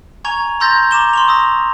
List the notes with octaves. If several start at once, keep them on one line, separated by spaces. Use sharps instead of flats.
G#5 A#5 C#6 G#6 F7
A#5 C6 E6 G6 A6 A#6
A#5 D6 E7 G7
C6 C#6 F7
C#6 D#6 E6 A#6